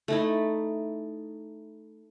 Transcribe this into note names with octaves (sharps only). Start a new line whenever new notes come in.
A3 D#4 E4